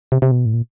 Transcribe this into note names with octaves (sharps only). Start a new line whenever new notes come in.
C3
C3
B2
A2
A#2